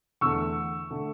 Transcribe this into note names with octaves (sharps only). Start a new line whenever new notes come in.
E2 D3 A3 C#6 E6
D3 A3